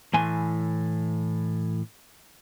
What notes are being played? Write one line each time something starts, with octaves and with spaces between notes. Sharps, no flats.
A2 E3 G#5 C6